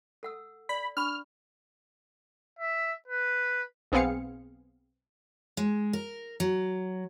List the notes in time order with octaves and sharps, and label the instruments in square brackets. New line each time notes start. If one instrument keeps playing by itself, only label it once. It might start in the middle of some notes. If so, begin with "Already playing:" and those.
[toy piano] A4 F#5 E6
[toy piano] D5 [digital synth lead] B5
[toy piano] D4 B5 C#6 [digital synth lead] F6
[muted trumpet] E5
B4
[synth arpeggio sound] B1 B3 C4 G#4 F5 C#7
[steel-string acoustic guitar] G#3
A#4
F#3